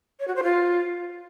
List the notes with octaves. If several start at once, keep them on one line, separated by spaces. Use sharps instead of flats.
C#5
F#4
C5
F4